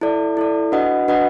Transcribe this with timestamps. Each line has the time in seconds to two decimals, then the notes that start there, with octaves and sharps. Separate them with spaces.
0.01 E4 A4 D5
0.37 E4 A4 D5
0.72 D4 F#4 B4 D#5 F#5
1.08 D4 F#4 B4 D#5 F#5